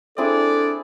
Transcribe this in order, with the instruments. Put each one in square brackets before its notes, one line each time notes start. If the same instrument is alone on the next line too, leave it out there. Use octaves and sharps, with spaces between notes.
[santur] C4 E4 G#4 [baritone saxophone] D4 [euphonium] A4 [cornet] D5